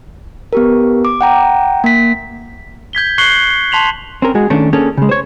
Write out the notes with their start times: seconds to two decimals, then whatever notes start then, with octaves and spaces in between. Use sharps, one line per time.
0.53 B3 G4 A#4
1.05 D6
1.21 F#5 G5 A#5
1.84 A#3 B6
2.93 G6 G#6 B6 G7
3.18 C#6 F#6 C7 C#7 F#7 G7
3.72 A5 C6 B6 F7 F#7
4.22 C4 C#4 A#4
4.35 G#3 F#4 G#4
4.50 D#3 A3 C#4 D4
4.73 A#3 C#4 D4 G#4 A4
4.97 C#3 G#3
5.09 C5 C#5